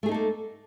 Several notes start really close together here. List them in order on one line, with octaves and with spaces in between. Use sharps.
A3 G#4 D#4 A4 A#3